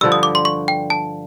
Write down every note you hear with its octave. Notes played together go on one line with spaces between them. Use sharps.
G2 D3 F3 E6
D#6
D6
C6
C#6
G5
A5